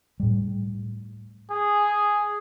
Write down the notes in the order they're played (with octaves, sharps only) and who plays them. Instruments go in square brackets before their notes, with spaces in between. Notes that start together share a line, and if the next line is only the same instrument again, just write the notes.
[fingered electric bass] A2 G3
[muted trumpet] G#4